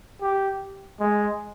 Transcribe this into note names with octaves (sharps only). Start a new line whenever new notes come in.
G4
G#3